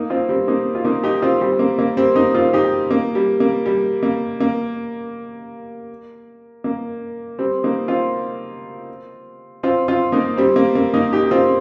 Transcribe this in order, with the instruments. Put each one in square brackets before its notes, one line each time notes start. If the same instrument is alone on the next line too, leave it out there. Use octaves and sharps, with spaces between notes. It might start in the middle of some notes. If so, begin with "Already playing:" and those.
Already playing: [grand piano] A#3 D#4
C4 F4
G3 C4
A#3 D#4
F4
A#3 D#4
D#4 G4
C4 F4
G3 C4
A#3
A#3
G3 C4
A#3 D#4
C4 F4
D#4 G4
A#3
G3
A#3
G3
A#3
A#3
A#3
G3 C4
A#3 D#4
C4 F4
C4 F4
C4 F4
A#3 D#4
G3 C4
A#3
A#3
A#3 D#4
D#4 G4
C4 F4